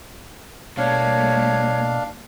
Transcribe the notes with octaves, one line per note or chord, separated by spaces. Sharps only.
B2 G3 A3 A#3 D4 C#5 F5